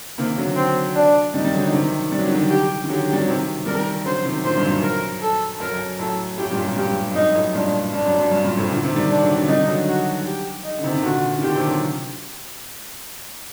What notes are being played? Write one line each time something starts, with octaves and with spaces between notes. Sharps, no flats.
C3 D#3 A#3
D3 F#3
C4
D4
D#3 G3 D#4
G3
D3 F#3
C3 D#3
G3
F#3
D#3
D3 F#3
G4
D#3
D3 F#3 G4
G3
F#3
C3 D#3
D#3 G3 A#4
D3 F#3 C5
C3 D#3
A#2 D3 C5
G2
F#2
A#4
A4
F#2 A#4
F#2
F#2 A2 A4
F#2 A2 G4
G2 A#2
F#2
G2
G2 G4
F#2
G2 D#4
F#2 A2
G2 A#2 D4
G2 D4
F#2
F#2
G2
G2 A#2
A2 C3
A#2 D3
C3 D#3
D#3 G3
D4
D3 F#3
D3 F#3
D#3 G3 D#4
D3 F#3
F#4
G4
D#4
D3
C3 D#3
D#3
A#2 D3 F#4
D#3
A#2 D3 G4
C3 D#3
D3 F#3